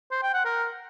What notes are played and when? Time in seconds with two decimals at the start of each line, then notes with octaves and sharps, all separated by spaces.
0.11 C5
0.23 G5
0.34 F#5
0.45 A#4